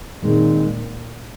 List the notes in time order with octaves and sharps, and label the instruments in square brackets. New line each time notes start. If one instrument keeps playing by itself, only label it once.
[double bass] A#2 [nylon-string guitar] D#3 G#3 C4 D#4